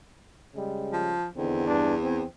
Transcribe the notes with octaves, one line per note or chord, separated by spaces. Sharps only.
C#3 G3 G#3
F3
E2 D3 D#3 C4
G2 C3 D4
C4